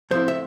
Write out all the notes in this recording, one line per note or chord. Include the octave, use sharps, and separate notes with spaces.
A2 F3 C4 E4 C5
E5